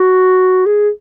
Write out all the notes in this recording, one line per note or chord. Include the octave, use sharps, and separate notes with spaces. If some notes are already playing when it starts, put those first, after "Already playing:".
Already playing: F#4
G#4